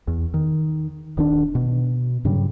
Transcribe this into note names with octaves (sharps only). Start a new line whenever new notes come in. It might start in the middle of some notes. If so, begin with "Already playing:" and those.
E2
D#3
D#1 D#3 D4
B2
G2 C#3 F#3 G3